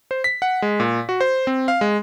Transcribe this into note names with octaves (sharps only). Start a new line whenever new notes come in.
C5
B6
F#5
G#3
A#2
F#4
C5
C4
F5
G#3